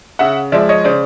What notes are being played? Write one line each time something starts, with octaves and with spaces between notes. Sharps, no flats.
C#3 E5 F#5
F3 G#3 D5 E5
C#5 D#5
C#3 C5 D5